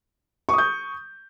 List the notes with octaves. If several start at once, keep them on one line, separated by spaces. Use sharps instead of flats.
C#6 D#6 G6